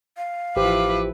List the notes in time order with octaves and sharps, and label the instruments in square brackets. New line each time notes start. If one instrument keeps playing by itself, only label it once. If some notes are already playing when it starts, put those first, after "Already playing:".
[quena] F5
[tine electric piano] A1 G4 C5 [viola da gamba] F3 E4 B4 [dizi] D6